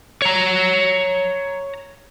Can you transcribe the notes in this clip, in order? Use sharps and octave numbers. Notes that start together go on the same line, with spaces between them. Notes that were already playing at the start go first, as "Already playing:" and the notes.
C#5 A#5